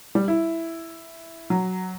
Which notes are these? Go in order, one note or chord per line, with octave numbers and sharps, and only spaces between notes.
G3
E4
F#3